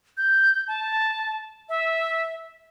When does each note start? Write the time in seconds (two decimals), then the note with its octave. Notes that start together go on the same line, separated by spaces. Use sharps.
0.17 G6
0.68 A5
1.69 E5